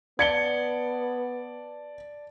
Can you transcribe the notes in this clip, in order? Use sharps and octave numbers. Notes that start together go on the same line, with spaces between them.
B3 D5 A5 G#6 C#7 G7